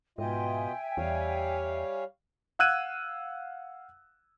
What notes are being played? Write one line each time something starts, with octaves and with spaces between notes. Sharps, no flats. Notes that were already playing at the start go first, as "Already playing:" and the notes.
G#2 B2 F4 D#5 E5 G5 G#5
E2 G3 C#5 F5
F5 F#5 E6 F#6 G#6 D#7